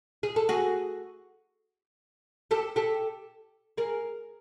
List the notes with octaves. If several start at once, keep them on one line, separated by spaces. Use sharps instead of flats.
G#4
A4
F#4 G#4
G4 A4
G4 A4
G#4 A#4